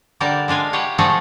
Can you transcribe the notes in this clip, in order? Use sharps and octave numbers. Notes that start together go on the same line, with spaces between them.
D3 G3 A#4 D5 A5
G#3 D4 F4 G#5
G4 B4 C#5 F5 F#5
F3 A3 F#4 G#4 C#5 D5